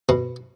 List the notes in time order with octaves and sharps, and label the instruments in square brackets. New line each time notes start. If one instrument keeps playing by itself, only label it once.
[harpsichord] B2